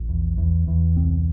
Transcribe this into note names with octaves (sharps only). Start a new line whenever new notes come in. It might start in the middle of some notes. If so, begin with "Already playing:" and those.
Already playing: A#1
E2
E2
E2
C2 C4